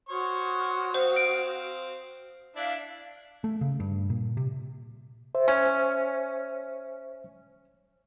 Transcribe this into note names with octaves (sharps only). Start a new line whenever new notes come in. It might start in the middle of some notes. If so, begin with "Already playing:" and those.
F#4 C5 C#5 C#6 D#6 F6
C4 C5 F5
D7
D4 E4 D5 F5 F#6
A3
C#3
G2
A#2
C3
C5 E5
C#4